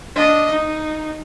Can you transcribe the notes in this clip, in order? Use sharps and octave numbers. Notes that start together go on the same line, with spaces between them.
D4 D#5
D#4